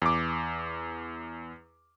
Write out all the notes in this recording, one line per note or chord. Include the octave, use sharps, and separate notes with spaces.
E2 D6